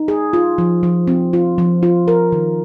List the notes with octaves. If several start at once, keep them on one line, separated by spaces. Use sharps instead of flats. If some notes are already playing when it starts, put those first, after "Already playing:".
Already playing: D#4
G#4
F4
F3
F3
C4
F4
F3
F4
A#4
D#3